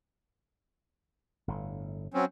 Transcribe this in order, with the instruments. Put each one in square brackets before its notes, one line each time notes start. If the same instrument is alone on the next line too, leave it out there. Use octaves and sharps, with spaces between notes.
[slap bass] G1 A2
[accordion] F#3 C4 C#4